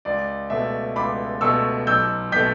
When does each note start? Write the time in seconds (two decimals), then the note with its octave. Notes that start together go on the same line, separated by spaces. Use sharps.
0.05 C#2 D5
0.50 B2 A3 E5
0.96 C#2 B5 D6
1.41 B2 A3 C#6 E6
1.87 B1 E6 G6
2.32 B2 A3 G6 B6